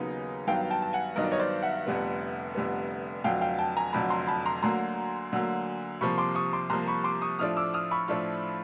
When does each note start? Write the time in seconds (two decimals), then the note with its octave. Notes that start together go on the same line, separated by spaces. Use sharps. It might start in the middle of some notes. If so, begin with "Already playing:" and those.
Already playing: D#2 C#3 F#3 B3 D#4
0.47 G2 D#3 F#3 B3 F5 G5
0.70 G5 A5
0.82 A5
0.93 F#5 G#5
1.16 G2 D#3 F#3 B3 D#5
1.24 D5
1.31 C#5 D#5
1.39 C5 D5
1.62 E5 F#5
1.86 F1 F2 D3 G3 B3
2.55 F1 F2 D3 G3 B3
3.24 F1 F2 D3 F#3 F5 G5
3.41 F5 G5
3.58 G5 A5
3.77 G#5 A#5
3.93 F1 F2 D3 F#3 A5 B5
4.10 A#5 C6
4.27 A5 B5
4.46 A#5 C6
4.62 D2 D3 F#3 A#3 A#5 C6
5.32 D2 D3 F#3 A#3
6.01 C2 C3 F3 A#3 B5 C#6
6.18 C6 D6
6.35 C#6 D#6
6.53 C6 D6
6.70 C2 C3 F3 A#3 A#5 C6
6.87 B5 C#6
7.04 C6 D6
7.22 C#6 D#6
7.39 A2 F3 A3 D4 F4 D#6 F6
7.57 D6 E6
7.74 D#6 F6
7.91 B5 C#6
8.08 A2 F3 A3 D4 F4